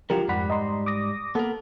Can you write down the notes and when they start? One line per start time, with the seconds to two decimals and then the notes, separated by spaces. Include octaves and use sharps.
0.10 D3 F3 F#3 F4 G4 A#4
0.28 F2 G#2 G3 F#5 B5
0.50 D#5 A#5 C6
0.86 D6 D#6 A#6
1.35 A#3 B3 A4 A#4